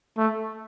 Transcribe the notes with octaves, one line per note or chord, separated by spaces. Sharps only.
A3